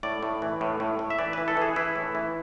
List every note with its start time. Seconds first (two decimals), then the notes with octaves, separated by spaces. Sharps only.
0.03 A2 D5
0.23 A2
0.42 E3
0.61 A2
0.80 A2
0.99 A2
1.10 E5
1.19 E3 D5
1.33 E3 B4
1.48 A4
1.57 E3 G#4
1.76 E3 E4
1.96 A2
2.15 E3